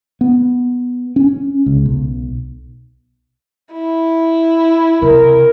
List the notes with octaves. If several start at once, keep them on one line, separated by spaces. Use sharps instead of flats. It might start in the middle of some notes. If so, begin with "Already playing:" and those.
B3
C#4
C#2
B1
E4
C3 A#4